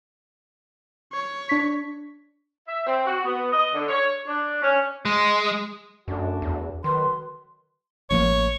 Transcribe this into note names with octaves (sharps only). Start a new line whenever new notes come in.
C#5
D4 B6
E5
C4
F#4
B3
D#5
D3
C#5
D4
C#4
G#3
F#2 A3 D4 F#4
E2
D#3 F#3 B4 C6
A1 F3 A#3 C#5